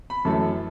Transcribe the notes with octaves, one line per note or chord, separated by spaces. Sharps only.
B5
F#2 E3 A3 A5